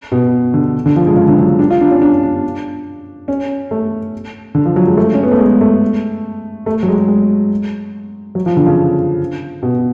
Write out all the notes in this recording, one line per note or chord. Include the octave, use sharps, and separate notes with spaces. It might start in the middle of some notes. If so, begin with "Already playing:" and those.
B2
D3
D3
F3
G#3
C#3
D3
F#3
D4
F4
D4
C#4
D4
D4
C#4
A3
D3
F3
F#3
G#3
A3
C#4
B3
A3
G#3
A3
A3
F#3
G#3
G#3
F#3
F3
D3
C#3
B2